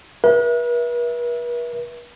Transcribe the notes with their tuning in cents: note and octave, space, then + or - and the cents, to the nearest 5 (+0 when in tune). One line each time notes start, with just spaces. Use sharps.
B4 -45 E5 +0